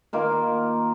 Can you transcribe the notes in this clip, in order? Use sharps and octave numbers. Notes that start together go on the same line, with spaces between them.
D#3 A#3 F4 A#4